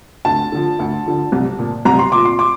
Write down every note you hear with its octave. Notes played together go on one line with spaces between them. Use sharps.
D2 A5
D3 F3
D2
D3 F3
C2
A#2 F3
C2 A#5
C6
A#2 F3 D6
C6
D6